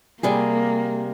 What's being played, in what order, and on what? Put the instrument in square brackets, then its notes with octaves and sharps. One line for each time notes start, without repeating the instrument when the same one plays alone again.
[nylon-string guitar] C3 G3 G#4 [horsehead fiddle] A#3